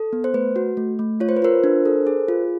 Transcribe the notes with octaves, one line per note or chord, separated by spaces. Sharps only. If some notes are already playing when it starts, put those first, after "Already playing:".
Already playing: A4
B3
C5
A3 B4
F#4
A3
A3
F4 C#5
C5
B4
F4 A#4 C5
D4
A4
G#4
F4